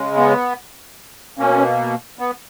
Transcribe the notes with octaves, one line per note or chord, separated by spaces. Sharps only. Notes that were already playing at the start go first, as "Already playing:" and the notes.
Already playing: C#3 G#3
B3
B2 A#3 C#4
B3